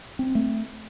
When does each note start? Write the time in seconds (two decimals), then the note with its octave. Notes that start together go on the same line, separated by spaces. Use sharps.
0.19 C4
0.35 A3